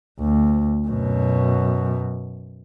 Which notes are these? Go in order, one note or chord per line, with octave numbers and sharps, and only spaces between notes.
D2
F#2 B2